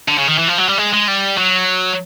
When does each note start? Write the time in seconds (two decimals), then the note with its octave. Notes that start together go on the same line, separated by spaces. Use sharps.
0.08 D3
0.18 C#3
0.28 D#3
0.38 E3
0.48 F3
0.58 F#3
0.68 G3
0.78 G#3
0.93 G#3
1.07 G3
1.38 F#3